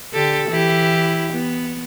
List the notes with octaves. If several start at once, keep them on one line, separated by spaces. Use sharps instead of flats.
D3 G4 A4
E3 E4 G4
B3